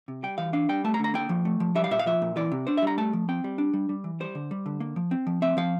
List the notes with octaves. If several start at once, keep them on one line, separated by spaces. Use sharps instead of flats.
C3
G3 G5
E3 F5
D4 F5
G3 G5
A3 A5
A#5
D3
A#5
A#3 G5
F3
A3
F3
G3 E5
F5
A#2 E5
F5
F3 E5
A#2
E3 D5
C3
D4 C5
E5
G3 A#5
A3 A5
F3
C4 G5
G3
D4
G3
G3
E3
G3 C5
D3
G3
D3
A#3
F3
C4
F3
C4 E5
F3 F5